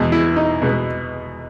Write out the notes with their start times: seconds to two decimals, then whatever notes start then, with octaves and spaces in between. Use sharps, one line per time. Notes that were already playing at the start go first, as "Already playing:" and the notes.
Already playing: E2 B2 G#3 B3
0.12 E4
0.36 D#4
0.62 B2 G#3 B3